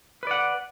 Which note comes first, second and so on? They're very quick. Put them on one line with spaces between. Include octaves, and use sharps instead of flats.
B4 D5 F#5